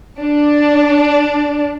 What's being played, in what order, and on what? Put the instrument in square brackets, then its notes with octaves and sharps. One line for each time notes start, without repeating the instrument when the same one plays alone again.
[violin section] D4